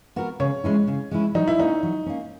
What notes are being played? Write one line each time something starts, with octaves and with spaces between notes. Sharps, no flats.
B3 F#4 A#4
C#3 C#5
G#3 C#4 E4
C#3
G#3 C#4 E4
F#3 D#4
E4
A#3 C#4 D#4
F#3
A#3 C#4